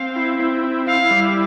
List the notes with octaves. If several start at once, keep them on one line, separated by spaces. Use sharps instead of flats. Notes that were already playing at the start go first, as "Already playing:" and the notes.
Already playing: C4 F5
E4
C4
E4
E4 F5
G3